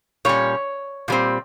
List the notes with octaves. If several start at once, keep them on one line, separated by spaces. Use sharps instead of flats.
A#2 G3 C#4 C#5
A#2 G3 C4